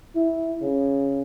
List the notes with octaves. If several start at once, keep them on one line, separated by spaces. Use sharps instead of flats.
E4
C#3